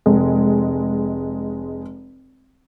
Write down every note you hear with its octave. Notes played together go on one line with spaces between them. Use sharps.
F1 G#3